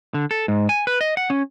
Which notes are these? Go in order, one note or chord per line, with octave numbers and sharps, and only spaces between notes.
D3
A4
G#2
G#5
B4
D#5
F#5
C#4